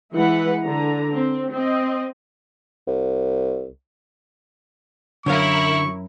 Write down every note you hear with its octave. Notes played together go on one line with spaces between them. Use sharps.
E3 G#3 E4 B4 F#5
D3 A#5
C4
C4 D#5
C2
F#2 D3 F#3 E4 A#4 C#5 F5 C#6